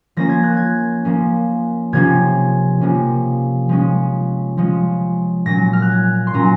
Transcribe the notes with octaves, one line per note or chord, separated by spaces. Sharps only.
F3 A#3 C#4 A#6
G#6
F#6
G#6
F3 A#3 C#4
C3 F3 A#3 C#4 G#6
C3 F3 A#3 C#4
F3 G#3 C#4
F3 G#3 C#4
A#2 F#3 C#4 A#6
F6
F#6
G#6
C6
A#2 F#3 C#4 A#5